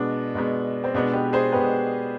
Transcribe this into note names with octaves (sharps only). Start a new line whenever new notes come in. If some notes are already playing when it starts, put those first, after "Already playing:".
Already playing: B2 G#3 B3 D4
B2 G#3 B3
C4
B2 G#3 B3 D4
G4 B4
G#4 C5
B2 G#3 B3 G4 B4